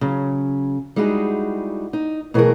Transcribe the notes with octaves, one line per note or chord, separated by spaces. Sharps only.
C#3 F#3
G3 G#3 D#4 E4 F#4 G#4
D#4
B2 E3 F#3 A3 G#4 A#4